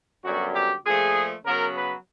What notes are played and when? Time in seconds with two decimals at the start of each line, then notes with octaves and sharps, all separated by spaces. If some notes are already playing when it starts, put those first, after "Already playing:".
0.24 F#2 D3 G3 B3 F#4
0.55 G4
0.85 A#2 F3 A3 G#4
1.45 C#3 F#3 B3 A#4
1.76 B4